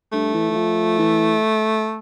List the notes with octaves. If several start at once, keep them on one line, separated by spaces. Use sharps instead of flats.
G2 A3
E3
E3
F3
E3